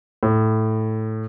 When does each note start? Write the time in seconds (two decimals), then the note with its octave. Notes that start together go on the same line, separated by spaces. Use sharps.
0.23 A2